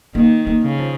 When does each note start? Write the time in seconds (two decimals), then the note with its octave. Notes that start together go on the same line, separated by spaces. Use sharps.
0.15 D#3 A#3
0.47 A#3
0.62 C#3
0.78 F3